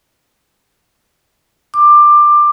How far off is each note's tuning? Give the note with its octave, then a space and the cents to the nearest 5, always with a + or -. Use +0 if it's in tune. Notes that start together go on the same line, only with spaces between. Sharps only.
D6 +15